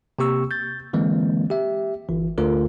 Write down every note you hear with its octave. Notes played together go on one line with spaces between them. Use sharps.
C3 A#3 G4 C#6 E6
G6 A6
D3 E3 G#3 A#3 C4
G4 E5
G1 E3
D2 D3 A3 F4 A#4